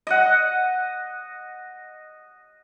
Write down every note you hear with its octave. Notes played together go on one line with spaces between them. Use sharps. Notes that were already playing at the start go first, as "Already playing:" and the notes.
D#5 F#5